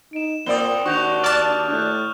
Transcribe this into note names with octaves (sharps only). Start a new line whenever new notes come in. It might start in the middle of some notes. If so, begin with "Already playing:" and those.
D#4 D7 E7
A#2 A#3 C4 D5 D#6 G7
D#2 D4 F#4 C#6 G6 F7
D5 A5 F6 F#6
A2 F#6 G6